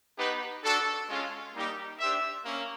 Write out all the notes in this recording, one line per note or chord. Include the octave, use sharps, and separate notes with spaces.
B3 D#4 G4 B4
D4 F#4 A4
G#3 C#4 F4
G3 A#3 D#4 G4
D4 G4 C5 E5
A#3 C#4